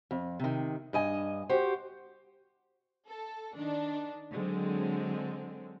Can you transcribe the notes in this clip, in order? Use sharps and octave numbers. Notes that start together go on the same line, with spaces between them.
F2
C3 D#3
G2 D#5 G#5
F#4 G4 C5
A4
D#3 D4
D3 F#3 G#3 C4